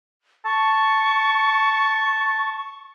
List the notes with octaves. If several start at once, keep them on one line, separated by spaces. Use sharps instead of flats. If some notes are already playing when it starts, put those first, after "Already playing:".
A5 C#6